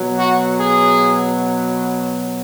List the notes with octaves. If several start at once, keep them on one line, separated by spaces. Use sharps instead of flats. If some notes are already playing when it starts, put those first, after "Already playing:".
Already playing: B2 F#3
F#4
G#4